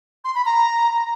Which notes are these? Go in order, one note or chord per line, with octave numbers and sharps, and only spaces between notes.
C6
B5
A#5